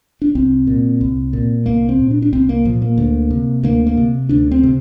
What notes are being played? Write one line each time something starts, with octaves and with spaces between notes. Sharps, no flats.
D4
C2 C4
A#2
C2
A#2
C2 A#3
C4
A#2
D4
D4
C2 C4
A#3
A#2 F3
A#3
D2
C3
D2 A#3
A#3
C3
D2 D4
C4
C3